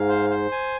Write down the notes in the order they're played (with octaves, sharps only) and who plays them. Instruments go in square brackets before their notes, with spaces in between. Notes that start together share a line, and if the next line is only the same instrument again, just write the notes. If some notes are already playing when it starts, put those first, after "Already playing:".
Already playing: [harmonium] G#2 [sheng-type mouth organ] F5
[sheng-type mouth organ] C5
C5
G#5